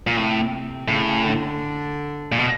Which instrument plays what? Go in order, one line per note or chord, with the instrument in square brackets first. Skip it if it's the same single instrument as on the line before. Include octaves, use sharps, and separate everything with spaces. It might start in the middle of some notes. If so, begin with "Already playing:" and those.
[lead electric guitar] A#2
[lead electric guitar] A2 [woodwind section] C3 C4
[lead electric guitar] A2 [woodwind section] C#3 C#4
[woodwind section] C#3 C#4
D3 D4
[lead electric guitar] A#2
B2